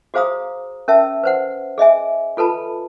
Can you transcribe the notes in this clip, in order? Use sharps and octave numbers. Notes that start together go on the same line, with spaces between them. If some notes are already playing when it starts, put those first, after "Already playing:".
F#4 G#4 C5 F5 A#5 D#6
C#4 A#4 E5 A5
B4 C5 F#5
G#4 D#5 E5 G#5
F4 A4 B4 A5 B5